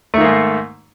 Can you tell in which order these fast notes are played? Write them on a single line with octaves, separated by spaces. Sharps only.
A3 D#3 A#3 G#2